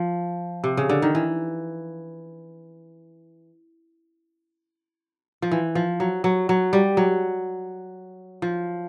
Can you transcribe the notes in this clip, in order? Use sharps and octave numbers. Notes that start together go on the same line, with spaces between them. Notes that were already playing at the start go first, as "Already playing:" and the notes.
Already playing: F3
C3
C#3
D3
D#3
E3
F3
E3
F3
F#3
F#3
F#3
G3
F#3
F3